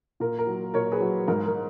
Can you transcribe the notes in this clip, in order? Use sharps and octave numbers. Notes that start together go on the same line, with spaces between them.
A#2 A#4
A#4
F#3
A#2 A#4 C#5
G#4 B4
F#3
G#2 A#4
A#4